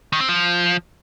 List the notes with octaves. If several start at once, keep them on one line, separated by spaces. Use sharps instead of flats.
D#3
C4
F3